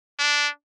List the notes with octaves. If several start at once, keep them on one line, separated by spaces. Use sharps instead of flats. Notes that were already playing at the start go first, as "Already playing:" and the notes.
D4